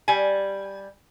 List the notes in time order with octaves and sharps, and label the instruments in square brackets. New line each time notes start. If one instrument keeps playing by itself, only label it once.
[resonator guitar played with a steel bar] G3 G#5